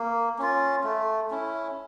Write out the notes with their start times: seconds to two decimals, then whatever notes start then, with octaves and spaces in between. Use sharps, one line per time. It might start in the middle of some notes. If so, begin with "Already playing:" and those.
Already playing: A#3
0.39 C#4 F4
0.84 A3
1.31 C#4 E4